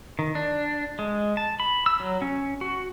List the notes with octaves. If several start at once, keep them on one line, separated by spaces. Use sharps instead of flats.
D#3
D4
G#3
A5
B5
E6
F#3
C#4
F#4